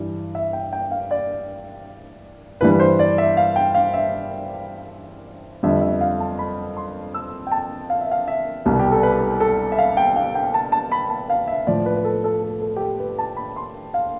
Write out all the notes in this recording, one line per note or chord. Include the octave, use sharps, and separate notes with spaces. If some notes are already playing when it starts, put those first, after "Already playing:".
Already playing: G2 E3 G3
E5
G5
G5
F5
D5
G2 E3 G3 B4
B4
C5
D5
E5
F5
G5
F5
E5
F2 D3 G3 E5
E5
F5
A5
B5
C6
E6
G5
A5
F5
E5
F5
E5
C2 B2 G3
G4
A4
B4
A4
E5
F5
G5
F5
G5
A5
A5
B5
A5
F5
E5
A2 F3 D5
B4
B4
A4
A4
A4
A4
G4
A4
B4
A5
B5
C6
F5